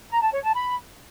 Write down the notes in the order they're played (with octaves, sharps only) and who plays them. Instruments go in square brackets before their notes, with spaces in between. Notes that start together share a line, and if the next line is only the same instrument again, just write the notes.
[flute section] A#5
A5
C#5
A5
B5